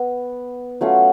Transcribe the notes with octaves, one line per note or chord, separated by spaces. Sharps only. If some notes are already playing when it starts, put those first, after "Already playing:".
Already playing: B3
F#3 A3 C#4 F4